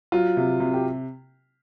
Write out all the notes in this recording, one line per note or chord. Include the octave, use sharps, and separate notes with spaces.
F#3 F4
C3
C3
G4